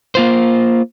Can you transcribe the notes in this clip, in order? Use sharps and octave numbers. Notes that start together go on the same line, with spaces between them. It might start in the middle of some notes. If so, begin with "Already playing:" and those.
A#3 F4 C5